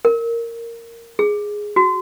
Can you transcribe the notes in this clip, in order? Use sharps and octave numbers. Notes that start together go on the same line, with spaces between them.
A#4
G#4
F#4